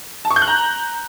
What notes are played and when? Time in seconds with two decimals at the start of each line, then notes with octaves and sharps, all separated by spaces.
0.25 A5
0.31 C#6
0.36 G6
0.42 F#6
0.48 A#5